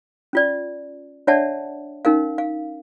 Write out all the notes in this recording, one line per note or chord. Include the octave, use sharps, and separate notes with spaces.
C#4 F4 D5
D4 C#5 D5 E5 F#5 A5
C#4 D#4 A#4 F5
F5